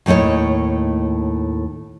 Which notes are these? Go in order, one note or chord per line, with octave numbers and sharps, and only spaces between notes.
D#2 A2 A3 D#4 C#5